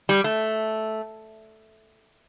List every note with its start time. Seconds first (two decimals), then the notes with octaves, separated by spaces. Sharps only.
0.09 G3
0.24 A3